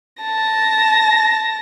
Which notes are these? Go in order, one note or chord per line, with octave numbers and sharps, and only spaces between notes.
A5 A#6